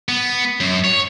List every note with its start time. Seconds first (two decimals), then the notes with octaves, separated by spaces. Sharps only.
0.09 B3
0.60 F#2
0.84 C#5